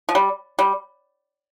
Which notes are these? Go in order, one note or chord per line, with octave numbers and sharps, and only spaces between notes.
F3
G3
G3